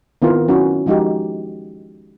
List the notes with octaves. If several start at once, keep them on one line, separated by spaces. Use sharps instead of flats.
D#3 B3 C4 E4 F4 A#4
F#3 C#4 E4 F#4
F3 G#3 D#4 F#4 G4